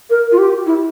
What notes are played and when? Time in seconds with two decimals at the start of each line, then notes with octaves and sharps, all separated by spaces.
0.10 A#4
0.32 F4
0.38 G4
0.66 E4